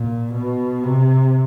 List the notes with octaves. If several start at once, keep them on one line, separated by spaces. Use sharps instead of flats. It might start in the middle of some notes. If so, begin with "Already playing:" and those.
Already playing: A#2
B2
C3